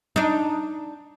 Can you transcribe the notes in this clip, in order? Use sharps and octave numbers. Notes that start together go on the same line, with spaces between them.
D4 D#4